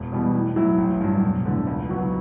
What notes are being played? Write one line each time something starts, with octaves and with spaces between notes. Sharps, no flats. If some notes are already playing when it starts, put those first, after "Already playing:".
Already playing: E1
E2 B2 G3
A2
F#3 A3 E4
A1
G2 F#3
E1
E2 D3 A3
C#2
B2 F#3 B3 F#4